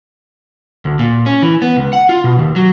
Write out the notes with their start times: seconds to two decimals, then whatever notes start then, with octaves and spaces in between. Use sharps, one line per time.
0.85 D2
0.99 A#2
1.26 C#4
1.42 E3
1.62 B3
1.76 C#2
1.93 F#5
2.09 F4
2.24 B2
2.39 D#2
2.56 F#3